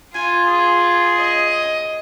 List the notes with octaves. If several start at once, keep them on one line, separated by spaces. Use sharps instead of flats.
F4 G#5
G#4
D#5